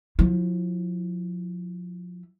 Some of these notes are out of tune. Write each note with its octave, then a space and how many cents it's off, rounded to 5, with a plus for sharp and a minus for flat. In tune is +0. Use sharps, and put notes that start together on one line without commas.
F3 +35 E4 +10